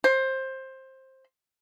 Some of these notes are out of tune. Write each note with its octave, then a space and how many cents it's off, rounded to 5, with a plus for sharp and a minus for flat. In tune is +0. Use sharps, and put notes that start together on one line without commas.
C5 +15